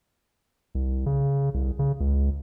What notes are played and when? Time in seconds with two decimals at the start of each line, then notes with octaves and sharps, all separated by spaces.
0.75 C2
1.06 C#3
1.54 C2
1.79 C#3
2.00 C#2